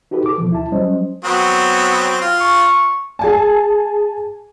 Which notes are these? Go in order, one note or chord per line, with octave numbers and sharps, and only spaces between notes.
D#4 F#4 G4 A4 B4
A4 D6
B2 E3 F3
D2 E4 A5
F#3 G3 C#4 C5 D#5
F#3 B3 C4
F4
C#6
G#4 G#5 A5